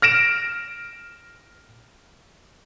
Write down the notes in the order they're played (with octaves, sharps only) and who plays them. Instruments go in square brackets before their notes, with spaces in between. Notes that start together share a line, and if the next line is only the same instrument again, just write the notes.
[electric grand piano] F6 A#6 D7 E7